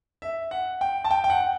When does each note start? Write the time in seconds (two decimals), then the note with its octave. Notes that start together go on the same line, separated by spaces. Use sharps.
0.22 E5
0.51 F#5
0.81 G5
1.04 A5
1.11 G5
1.24 G5
1.30 F#5